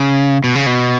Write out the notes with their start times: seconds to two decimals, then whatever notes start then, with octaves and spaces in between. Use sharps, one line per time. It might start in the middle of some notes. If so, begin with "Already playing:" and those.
Already playing: C#3
0.44 B2
0.55 C#3
0.66 B2